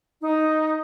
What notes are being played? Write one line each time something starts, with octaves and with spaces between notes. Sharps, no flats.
D#4